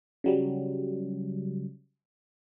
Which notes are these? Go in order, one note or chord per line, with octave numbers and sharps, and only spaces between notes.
C#3 F#3 G3